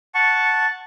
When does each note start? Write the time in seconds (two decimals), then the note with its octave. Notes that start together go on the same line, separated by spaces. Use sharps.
0.15 F#5 A5 C#6